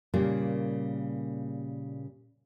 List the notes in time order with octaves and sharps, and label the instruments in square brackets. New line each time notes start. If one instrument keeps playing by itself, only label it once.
[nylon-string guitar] A#2 C#3 G3 A#3